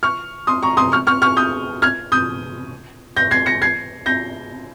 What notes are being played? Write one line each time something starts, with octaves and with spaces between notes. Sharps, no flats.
C#6 F6
C6 D#6
A#5 C#6
C6 D#6
C#6 F6
C#6 F6
C#6 F6
D#6 G6
F6 G#6
D#6 G6
G6 A#6
G#6 C7
A#6 C#7
G#6 C7
G6 A#6